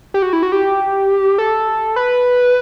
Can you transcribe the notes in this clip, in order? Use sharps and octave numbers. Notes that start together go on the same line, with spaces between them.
G4
F#4
E4
F#4
G4
A4
B4